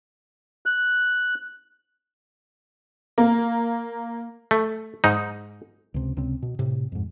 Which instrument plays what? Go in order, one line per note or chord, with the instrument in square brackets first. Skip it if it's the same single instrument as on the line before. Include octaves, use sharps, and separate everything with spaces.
[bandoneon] F#6
[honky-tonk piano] A#3
[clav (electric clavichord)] A3
G#2 D#4
[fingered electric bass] C#2 C3
C#2 C3 C4
B2
A2 C3
F2 G#2